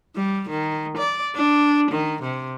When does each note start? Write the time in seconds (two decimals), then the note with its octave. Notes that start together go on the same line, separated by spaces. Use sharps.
0.16 G3
0.49 D#3
0.97 D5
1.36 D4
1.91 D#3
2.23 C3